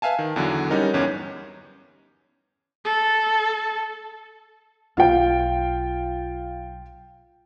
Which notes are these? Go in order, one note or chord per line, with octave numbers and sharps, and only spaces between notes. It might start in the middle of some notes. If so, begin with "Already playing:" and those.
B4 E5 F5 G#5 A5
D#3
E2 D3 F#3
G3 C#4 D#4 A#4
G1 E2 C#4
A4
B1 F4 F5 G5